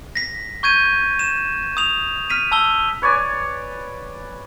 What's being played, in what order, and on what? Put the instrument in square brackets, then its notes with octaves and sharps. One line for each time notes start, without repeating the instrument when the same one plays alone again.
[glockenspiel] A#6 B6
C#6 G6 G#6 D#7
E7
D#6 F7
F6 B6 D#7
A5 E6 G7
[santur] B4 C#5 D5 G#5